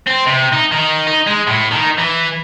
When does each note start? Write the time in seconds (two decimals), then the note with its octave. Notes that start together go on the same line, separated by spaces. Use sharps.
0.07 C4
0.26 C3
0.53 D#4
0.72 D#3
1.07 D#4
1.27 G#3
1.47 A2
1.71 D#3
1.98 E3